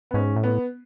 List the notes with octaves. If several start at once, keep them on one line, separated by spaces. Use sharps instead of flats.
B3
G#2 C#4
A2
B3